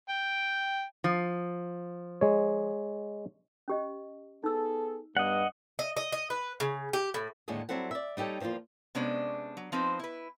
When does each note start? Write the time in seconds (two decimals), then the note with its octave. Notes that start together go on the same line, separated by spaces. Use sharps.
0.09 G5
1.04 F3
2.21 G#3 C#5
3.68 C#4 G4 D#5
4.44 B3 D#4 G#4 A4 E6
5.17 G2 B3 D5 D#5 F#5
5.79 D#5
5.97 D#5
6.12 D#5
6.30 B4
6.60 C#3
6.93 G4
7.14 A2
7.48 D#2 A2 D3 G#3 A3 G#4
7.69 F#3 G3 C4 E4 A4 F#5
7.91 D5 E5
8.17 G3 D#4 G4 A4 C#5
8.40 E2 F3 A3 A#3 F4
8.95 C3 G#3 B3 C#4 D4 C5
9.57 F#3
9.72 F3 C4 D#4 B4 C5
9.99 E4 B4